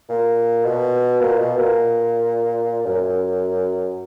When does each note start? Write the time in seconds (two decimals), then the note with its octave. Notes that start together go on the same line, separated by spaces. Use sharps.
0.09 A#2
0.65 B2
1.20 A#2
1.38 B2
1.57 A#2
2.86 F#2